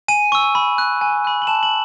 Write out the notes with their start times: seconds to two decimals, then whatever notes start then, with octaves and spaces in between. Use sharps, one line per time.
0.08 G#5 D#7
0.32 C#6 E6
0.55 B5
0.78 F#6
1.01 G#5
1.25 B5 F#6
1.42 F#7
1.47 A5 E7
1.63 F#7